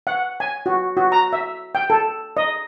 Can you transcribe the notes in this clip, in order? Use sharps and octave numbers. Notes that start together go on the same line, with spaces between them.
F#5
G#5
F#4
F#4
A#5
E5
G5
A4
D#5